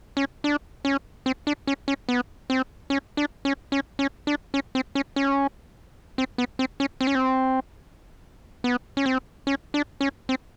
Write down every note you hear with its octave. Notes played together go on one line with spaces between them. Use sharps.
C#4
D4
C#4
C4
D4
C#4
C#4
B3
C4
C#4
D4
C#4
C#4
C#4
D4
C#4
C4
C#4
C#4
C4
B3
C4
C#4
C4
C#4
C4
B3
C#4
C4
C#4
D4
C#4
C4